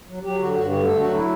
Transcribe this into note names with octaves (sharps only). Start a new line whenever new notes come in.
F#3
F#3 G4
D3 F#4
G2 F#4
D3 G4
A3 A4
F#3 F#4
E4